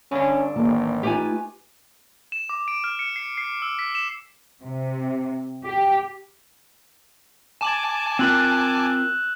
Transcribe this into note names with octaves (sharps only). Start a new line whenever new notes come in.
G2 D3 C#4 D4
A1 D#3 A#3 A5
A3 D#4 F4 G4 B4 G#5
E7
D6
D7
F6
C#7
C7
C7
E6
B6
E7
C3
G4
G#5 A5 D6 E7 F#7
C4 F4 A#4 E6 F#6 F#7